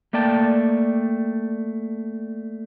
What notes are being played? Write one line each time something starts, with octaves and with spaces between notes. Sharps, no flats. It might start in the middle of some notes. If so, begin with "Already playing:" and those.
A3 A#3 D5 G5 A5